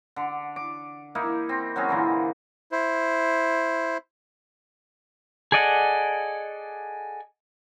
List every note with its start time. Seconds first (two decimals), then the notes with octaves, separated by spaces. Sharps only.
0.16 D3
0.56 D6
1.15 A#3 D#4 E4
1.49 C4
1.76 F#3 C4 C#4 G#4
1.89 A#2 D3 E3
2.72 E4 C5
5.52 G#4 A4 D5 D#5 F#5